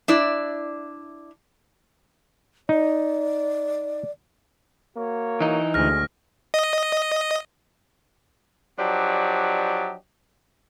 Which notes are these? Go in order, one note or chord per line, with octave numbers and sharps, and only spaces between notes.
D4 E4 D5
D#4 D5
A#3 F#4 C#5
E3 D#4
D2 G#3 C#4 F6 A#6
D#5
F3 F#3 D4 G4 D5 D#5